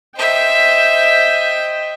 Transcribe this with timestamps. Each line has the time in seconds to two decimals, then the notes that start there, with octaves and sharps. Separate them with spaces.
0.17 C5 D#5 E5 G5